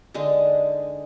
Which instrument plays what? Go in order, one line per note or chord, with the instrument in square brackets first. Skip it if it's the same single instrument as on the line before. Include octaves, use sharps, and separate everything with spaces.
[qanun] D3 G#3 D4 D#4